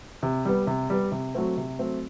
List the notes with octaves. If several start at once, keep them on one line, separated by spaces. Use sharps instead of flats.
C3
G3 B3
C3
G3 B3
C3
F#3 A3 C4
C3
F#3 A3 C4